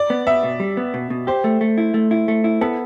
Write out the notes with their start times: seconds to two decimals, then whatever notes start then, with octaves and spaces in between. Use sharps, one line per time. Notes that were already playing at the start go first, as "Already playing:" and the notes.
Already playing: D5
0.10 B3
0.27 B3 E5
0.43 B2
0.60 G3
0.77 B3
0.94 B2
1.10 B2
1.27 G4 C5
1.44 A3
1.61 A3
1.78 E4
1.94 A3
2.11 E4
2.28 A3
2.44 E4
2.61 B3 A4